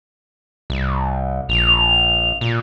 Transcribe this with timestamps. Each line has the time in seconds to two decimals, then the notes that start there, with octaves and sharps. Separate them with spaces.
0.70 C2
1.49 A#1 F7
2.41 A#2